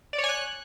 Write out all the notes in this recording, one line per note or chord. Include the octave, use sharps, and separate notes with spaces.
D5
C#5
G#5
F#6